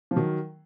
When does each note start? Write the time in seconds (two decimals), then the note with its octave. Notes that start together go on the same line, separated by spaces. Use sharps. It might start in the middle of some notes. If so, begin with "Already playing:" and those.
0.11 F3
0.16 D#3 F#3